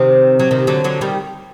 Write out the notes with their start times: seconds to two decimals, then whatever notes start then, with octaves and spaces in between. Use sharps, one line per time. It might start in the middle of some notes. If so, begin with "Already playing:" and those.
Already playing: C3 D#3
0.39 F#3
0.51 C3 D#3
0.67 D3 F#3
0.84 D3 F#3
1.01 D#3 G3